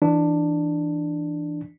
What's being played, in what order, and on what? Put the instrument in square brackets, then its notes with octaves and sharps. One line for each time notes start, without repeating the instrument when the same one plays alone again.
[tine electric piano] E3 D4